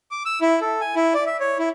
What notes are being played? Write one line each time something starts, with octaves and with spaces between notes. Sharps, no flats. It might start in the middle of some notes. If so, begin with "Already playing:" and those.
D6
E6
E4
A4
G#5
E4
D5
E5
C#5
E4